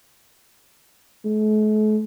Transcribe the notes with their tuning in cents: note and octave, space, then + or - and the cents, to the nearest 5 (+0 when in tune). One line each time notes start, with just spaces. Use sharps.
A3 -45